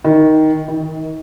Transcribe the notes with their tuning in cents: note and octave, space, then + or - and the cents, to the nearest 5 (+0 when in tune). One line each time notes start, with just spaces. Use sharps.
D#3 +10
D#3 +35